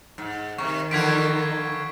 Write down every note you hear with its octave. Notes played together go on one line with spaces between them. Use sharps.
G#2
C3 D#3 C#6
D3 E3 F3 G#6 B6 D7